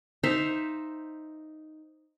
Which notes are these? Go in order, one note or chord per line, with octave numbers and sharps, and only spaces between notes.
D#4 C5 E5 F5